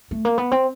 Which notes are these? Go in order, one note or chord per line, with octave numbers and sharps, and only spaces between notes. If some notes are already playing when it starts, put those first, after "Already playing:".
A3
A#3
B3
C4